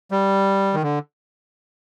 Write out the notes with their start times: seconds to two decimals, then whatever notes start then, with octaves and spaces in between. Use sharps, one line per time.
0.11 G3
0.74 D#3
0.83 D3